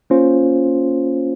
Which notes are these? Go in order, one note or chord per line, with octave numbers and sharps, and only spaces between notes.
A#3 C#4 F4 C5